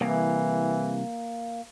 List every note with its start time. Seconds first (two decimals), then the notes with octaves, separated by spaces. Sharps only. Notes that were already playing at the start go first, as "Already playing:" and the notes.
0.01 C2 E3 A#3